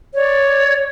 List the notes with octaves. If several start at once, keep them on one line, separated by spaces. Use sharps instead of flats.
C#5 D5